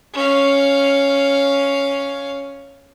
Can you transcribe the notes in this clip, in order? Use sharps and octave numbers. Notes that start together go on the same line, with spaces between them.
C#4 F5